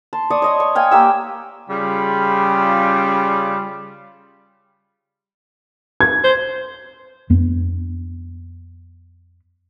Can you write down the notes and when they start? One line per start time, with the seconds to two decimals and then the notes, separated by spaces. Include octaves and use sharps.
0.13 A5 C6
0.30 D5 C6 C#6 D#6
0.42 C#5 D#5 A5
0.60 C#6
0.75 F5 G5 G#5
0.91 A#3 G4 E6
1.70 C#3 G3 F4
6.00 G#6
6.24 C5
7.30 F2 B3 D4